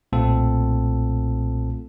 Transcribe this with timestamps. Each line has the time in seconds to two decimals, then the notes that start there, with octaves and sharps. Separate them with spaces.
0.13 B1 A#2 A3 C4 F4 A4